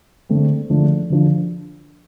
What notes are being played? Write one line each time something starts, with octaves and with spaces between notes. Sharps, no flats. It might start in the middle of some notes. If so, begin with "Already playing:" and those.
D3 A3 C4
D3 F3 A3 D4
D3 F3 D4